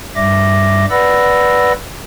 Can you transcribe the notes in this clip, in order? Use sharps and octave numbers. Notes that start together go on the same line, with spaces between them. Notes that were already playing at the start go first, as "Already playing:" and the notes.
G2 G3 E5 D6 A#6
B4 D5 F#5 B5 E6 A#6